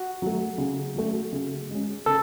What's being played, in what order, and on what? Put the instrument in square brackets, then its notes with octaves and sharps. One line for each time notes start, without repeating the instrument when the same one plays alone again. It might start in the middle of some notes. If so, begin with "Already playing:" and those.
Already playing: [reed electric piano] F#4
[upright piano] F#3 A3
C#3
F#3 A3
C#3
G#3 C#4
[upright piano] C#3 [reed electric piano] A4